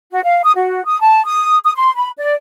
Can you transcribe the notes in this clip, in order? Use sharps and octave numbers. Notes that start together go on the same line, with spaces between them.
F#4
F5
D#6
F#4
D#6
A5
D#6
D#6
C6
B5
D5